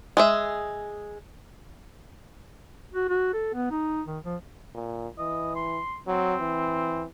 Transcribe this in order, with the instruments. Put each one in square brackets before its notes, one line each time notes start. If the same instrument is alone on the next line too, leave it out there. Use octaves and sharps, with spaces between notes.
[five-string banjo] G#3 G#4 E5
[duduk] F#4
F#4
A4
B3
D#4
D#3
F3
[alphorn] A#2
[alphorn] E3 [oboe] D#5
[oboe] C6
[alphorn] F#3 [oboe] C4
[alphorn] E3